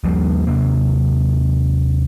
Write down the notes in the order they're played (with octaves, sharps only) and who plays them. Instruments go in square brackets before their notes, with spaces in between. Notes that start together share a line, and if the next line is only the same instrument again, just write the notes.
[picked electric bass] D#2 F3 G3 A#3
D#2 C3 A#3